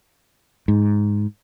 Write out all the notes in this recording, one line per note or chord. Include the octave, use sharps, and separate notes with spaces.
G#2